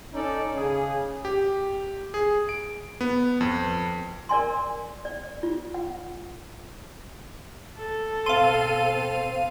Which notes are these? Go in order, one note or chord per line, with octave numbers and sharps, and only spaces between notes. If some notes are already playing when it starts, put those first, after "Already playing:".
C#4 D#4 A4 D5
C#3 G#4
G4
G#4
D7
B3
F2
A#4 D5 G#5 C6
D5
F4
F#5
A4
B2 C4 F5 C6 D#7